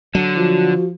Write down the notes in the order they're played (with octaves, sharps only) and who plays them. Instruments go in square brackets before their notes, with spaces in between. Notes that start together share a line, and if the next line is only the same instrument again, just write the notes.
[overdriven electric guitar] D3 [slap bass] F#3
[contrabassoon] F3 [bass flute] F#4